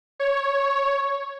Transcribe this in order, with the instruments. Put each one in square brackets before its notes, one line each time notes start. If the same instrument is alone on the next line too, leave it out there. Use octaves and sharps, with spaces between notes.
[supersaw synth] C#5